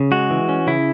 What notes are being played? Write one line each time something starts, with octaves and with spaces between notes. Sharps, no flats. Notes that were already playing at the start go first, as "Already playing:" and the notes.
Already playing: C#3
G#3 F#4
E3
C#4
C#3 E4